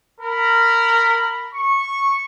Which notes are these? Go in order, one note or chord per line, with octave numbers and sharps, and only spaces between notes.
A#4 B5
C#6